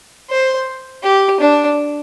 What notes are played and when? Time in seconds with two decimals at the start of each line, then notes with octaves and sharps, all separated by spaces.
0.30 C5
1.03 G4
1.40 D4